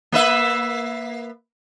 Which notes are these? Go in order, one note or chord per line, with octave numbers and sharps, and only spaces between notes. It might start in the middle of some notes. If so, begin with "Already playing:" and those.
A#3 B4 E5